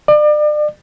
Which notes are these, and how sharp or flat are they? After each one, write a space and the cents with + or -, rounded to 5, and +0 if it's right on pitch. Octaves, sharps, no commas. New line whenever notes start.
D5 +35